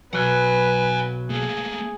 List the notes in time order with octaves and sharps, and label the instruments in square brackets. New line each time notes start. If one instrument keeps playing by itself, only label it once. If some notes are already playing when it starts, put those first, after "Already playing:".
[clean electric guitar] B1 F#3 [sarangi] B4 [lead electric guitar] F#5 G#5
[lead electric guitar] A3 A#3 [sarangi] G#4